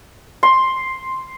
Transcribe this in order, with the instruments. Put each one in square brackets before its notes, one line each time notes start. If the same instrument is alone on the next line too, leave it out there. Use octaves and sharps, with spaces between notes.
[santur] C6